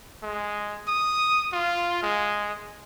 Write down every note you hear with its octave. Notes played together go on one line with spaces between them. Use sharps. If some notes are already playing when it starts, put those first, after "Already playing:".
G#3
D#6
F4
G#3